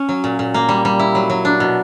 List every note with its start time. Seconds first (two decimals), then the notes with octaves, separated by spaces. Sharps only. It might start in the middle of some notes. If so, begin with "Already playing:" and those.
Already playing: C#4
0.09 F#3
0.24 A#2
0.39 A#2
0.54 A#3
0.69 G3
0.85 G3
0.99 E4
1.15 F#3
1.30 F#3
1.45 D4
1.60 B2